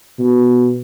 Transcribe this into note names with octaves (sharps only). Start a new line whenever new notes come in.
B2